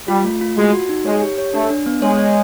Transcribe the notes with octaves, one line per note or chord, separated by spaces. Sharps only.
G3 F4
A3
F4
G#3 F#4
F#4
D#4
G#3 C#5
G4
C#5
A3 D4
D4
B3
G#3 C#5
C#5